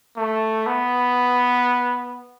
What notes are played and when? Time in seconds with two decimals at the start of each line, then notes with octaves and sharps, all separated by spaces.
0.17 A3
0.67 B3